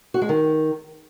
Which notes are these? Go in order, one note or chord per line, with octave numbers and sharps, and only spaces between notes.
F#4
G#3
D#3